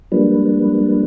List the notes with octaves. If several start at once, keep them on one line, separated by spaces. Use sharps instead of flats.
F3 G3 G#3 A#3 D4 B4